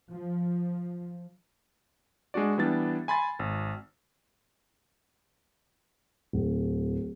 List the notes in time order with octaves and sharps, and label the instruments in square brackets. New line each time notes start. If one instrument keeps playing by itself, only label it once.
[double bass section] F3
[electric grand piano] G#3 D4 F#4 D5
E3 G3 B3 D4 A6
G#5 B5 C6 A6
G#1
[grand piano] D1